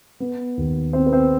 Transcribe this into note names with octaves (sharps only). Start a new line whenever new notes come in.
B3
D#2
B3 C4 C5
B4
C4 C5